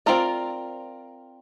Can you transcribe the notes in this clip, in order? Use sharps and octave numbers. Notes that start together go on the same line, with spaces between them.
C4 F4 A#4 D5